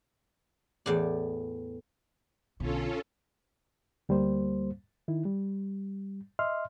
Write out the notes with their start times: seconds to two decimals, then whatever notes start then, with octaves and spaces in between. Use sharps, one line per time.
0.86 E2 A2 D5
2.60 B1 D3 C#4 F4 A4
4.09 D2 G3 A#3 C5
5.08 D#3 E4
5.25 G3
6.39 D#5 E5 C6 F6